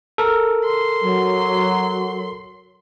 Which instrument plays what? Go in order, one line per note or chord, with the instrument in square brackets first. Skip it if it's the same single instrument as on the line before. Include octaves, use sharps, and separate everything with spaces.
[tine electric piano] A4 A#4
[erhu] C6
[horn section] F#3